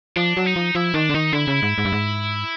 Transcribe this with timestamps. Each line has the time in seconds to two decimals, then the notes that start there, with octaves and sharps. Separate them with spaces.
0.16 F3 D4
0.37 F#3
0.46 D#4
0.56 F3
0.75 F3 E4
0.94 D#3 D4
1.09 D3
1.14 D#3 D#4
1.33 D3 E4
1.47 C#3
1.62 G#2
1.78 G#2
1.85 G2
1.92 G#2